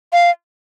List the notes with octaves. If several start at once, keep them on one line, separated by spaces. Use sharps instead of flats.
F5